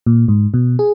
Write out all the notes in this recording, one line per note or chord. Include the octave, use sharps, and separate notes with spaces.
A#2
G#2
B2
G#4